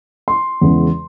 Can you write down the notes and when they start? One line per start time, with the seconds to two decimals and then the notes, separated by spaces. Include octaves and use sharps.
0.28 C6
0.61 E2 C#3 E3 G#3